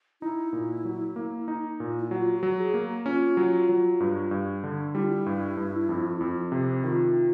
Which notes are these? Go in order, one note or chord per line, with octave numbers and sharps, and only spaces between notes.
D#4 E4
A#2
F#3
A#3
D#4
A#2
E4
F#3 F4
F#4
F#3
G#4
A#3
C#4 F4
F#3
F#3
G2
G2
D3
G3 E4
F4
E4
G2
G2
F2
F2
C3
D#3 F4